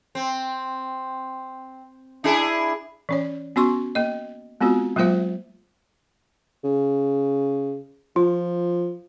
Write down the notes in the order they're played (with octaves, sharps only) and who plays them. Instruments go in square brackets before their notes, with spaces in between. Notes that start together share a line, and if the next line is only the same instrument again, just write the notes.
[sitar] C4
D4 E4 G#4
[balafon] E3 C#4 C#5
B3 C#4 F#4 C6 C#6
A#3 D#5
G#3 B3 C4 F4 F#4
F#3 G#3 A#3 F4 C5 E5
[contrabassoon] C#3
[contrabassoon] F3 [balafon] F4